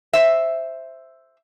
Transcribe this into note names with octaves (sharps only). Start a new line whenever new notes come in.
C5 E5